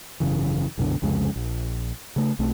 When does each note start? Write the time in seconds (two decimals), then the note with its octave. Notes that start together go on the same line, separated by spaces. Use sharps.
0.20 G#1 F#2 C#3 E3
0.78 C2 F#2 B2 D3
1.02 C2 F2 C#3 G#3
1.36 A#1
2.16 C#3 A3
2.39 B1 A3 C4